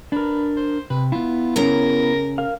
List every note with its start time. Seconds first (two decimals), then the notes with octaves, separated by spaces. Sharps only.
0.12 D4 A#4 B4
0.57 C5
0.90 C3 B4
1.12 B3 E4 F4
1.56 C#3 A#4 A#5
2.38 A#4 F5